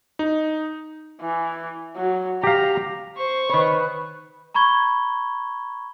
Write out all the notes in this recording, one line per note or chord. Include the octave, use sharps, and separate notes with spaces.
D#4
E3
F#3
G4 F5 A#5
C5 C#6
D#3 B4 C#5 B5
A#5 B5 C#6 G#6 G7